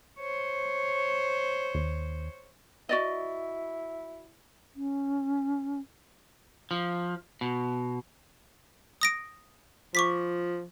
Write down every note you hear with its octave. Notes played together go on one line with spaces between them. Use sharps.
C5 C#5
D#2
E4 F#4 D5 D#5
C#4
F3
B2
D#6 A#6 D7
F3 C#6 D6 B6